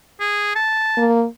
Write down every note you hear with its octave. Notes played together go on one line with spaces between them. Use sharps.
G#4
A5
A#3